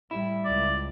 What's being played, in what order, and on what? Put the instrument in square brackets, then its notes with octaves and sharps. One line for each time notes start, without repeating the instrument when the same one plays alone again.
[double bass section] A2 G3 [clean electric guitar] E4
[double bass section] C#2 [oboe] D5